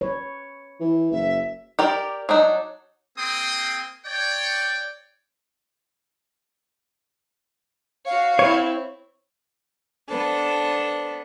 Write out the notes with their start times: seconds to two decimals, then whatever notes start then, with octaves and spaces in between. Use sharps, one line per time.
0.01 B4 C#5
0.80 E3
1.11 F#1 E5
1.79 G4 A#4 D5
2.29 F#3 D4 D#4
3.18 A#3 C4 G#4 G5 C6 D#6
4.05 C#5 D5 G5
8.06 F#4 C#5 F5
8.39 C4 E4 C#5
10.09 B3 D4 A4 C5